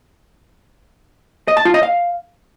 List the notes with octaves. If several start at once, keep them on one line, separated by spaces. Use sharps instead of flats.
D#5
A5
F4
D#5
F5